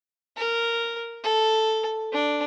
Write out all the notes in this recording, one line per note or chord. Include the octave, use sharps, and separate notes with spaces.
A#4
A4
D4